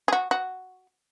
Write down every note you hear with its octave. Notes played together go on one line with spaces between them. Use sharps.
G#4
F#4
F#4